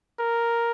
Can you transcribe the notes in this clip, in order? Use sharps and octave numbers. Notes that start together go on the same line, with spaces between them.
A#4